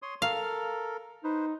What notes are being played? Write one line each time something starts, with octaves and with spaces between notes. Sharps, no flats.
C#5 C6 D#6
A4 A#4 F5
D#4 B4 C5